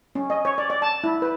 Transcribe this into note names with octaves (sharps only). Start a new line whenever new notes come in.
C#4
D#5
C#5
D5
D5
A5
E4
B4